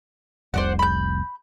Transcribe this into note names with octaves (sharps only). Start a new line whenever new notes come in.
F1 C2 C5 D5 F#5
B5 G6